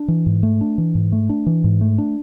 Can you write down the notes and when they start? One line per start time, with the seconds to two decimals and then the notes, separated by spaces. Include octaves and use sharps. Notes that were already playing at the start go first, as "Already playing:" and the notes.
Already playing: D4
0.08 E3
0.26 G#2
0.43 A3
0.61 D4
0.78 E3
0.95 G#2
1.12 A3
1.29 D4
1.46 E3
1.64 G#2
1.81 A3
1.98 D4